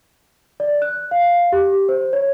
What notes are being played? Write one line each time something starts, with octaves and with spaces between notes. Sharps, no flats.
D5
F#6
F5
G4
C5
C#5